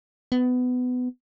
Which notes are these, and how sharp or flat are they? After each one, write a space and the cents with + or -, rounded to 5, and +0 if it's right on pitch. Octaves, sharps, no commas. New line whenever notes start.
B3 +20